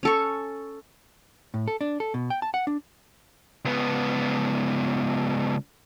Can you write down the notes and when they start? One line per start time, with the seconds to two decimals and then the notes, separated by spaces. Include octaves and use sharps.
0.03 C#4 A4 C#6
1.54 A2
1.68 A4
1.81 D4
2.00 A4
2.14 B2
2.30 G5
2.42 A5
2.54 F#5
2.67 D4
3.65 C#2 B3